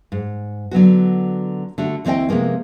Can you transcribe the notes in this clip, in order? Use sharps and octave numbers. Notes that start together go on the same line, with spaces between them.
G#2
D3 F#3 B3 F#4
D3 A3 F#4
D2 E3 C4 B4 D#5 G5
C3 F3 G#3 A#3 B3